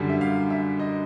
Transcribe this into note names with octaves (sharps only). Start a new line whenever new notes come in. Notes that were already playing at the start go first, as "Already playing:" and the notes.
Already playing: F#2 D3 G3
E5
F5
E5
D#5